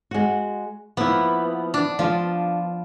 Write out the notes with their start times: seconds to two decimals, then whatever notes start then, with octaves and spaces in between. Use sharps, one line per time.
0.11 G#3 F#4
0.97 F3 A#3 B3 E4
1.74 D4
1.99 F3 D4 F4